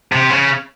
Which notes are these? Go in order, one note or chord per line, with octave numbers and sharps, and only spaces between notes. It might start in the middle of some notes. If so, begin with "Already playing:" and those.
C3
C#3